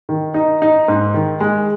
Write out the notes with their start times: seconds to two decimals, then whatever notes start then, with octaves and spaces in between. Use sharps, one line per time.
0.09 D#3
0.34 D#4
0.62 D#4
0.88 G#2
1.14 D#3
1.40 G#3